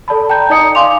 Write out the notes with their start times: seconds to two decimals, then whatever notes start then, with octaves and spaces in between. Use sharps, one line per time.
0.08 A4 D5 A5 B5
0.30 G5 A5 A#5 G6
0.50 D#4 D5 D#5 A#5 D#6 C#7
0.75 F5 G#5 C6 D6 F7